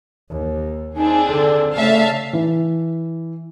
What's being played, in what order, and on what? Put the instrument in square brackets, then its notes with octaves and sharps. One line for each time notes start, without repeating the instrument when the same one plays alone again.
[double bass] D#2
[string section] C4 D4 G#4 [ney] D#4
[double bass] D3 [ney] A4
[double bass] C#3 D4 [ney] A3 [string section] E5 F5 A5
[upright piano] E3